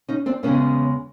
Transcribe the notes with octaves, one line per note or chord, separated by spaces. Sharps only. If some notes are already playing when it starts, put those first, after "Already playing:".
C#4 D#4
C4 D4
E2 C#3 F3 G#3 B3 C#4